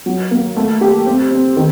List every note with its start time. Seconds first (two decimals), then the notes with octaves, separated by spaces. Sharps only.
0.06 F#3
0.31 A#3
0.57 A3
0.81 G4
1.06 C4
1.31 C4
1.56 D#3